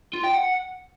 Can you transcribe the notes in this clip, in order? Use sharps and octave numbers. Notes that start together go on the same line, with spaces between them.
F4
G5
F#5